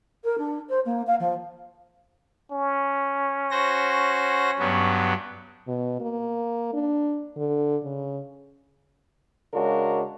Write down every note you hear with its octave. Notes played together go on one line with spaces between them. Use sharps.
A#4
D4
C5
A#3
F5
F3
C#4
F#4 C5 A#6
G2 F#3 B3
B2
A#3
D4
D3
C#3
C#3 G#3 D4 F#4 A#4